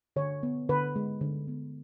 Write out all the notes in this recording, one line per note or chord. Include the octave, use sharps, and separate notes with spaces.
D3 C#5
B3
D3 B4
G#3
D3
B3